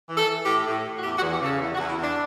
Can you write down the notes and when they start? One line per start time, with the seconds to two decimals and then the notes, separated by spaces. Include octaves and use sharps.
0.08 E3
0.17 A4
0.26 E3
0.45 A2 G4
0.65 A2
0.84 A2
0.98 F#4
1.03 E2 G4
1.17 F#4
1.21 E2
1.31 G4
1.41 C#3 A4
1.60 E2
1.74 F#4
1.79 E2
1.87 E4
1.97 E2
2.02 D4